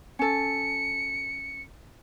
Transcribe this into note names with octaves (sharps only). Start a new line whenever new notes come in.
C#4 A4 C#7